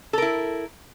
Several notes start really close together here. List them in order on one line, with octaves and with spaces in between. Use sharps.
A4 A#4 E4